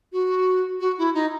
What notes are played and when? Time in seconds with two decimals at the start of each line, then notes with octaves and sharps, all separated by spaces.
0.12 F#4
0.80 F#4
0.98 E4
1.14 D#4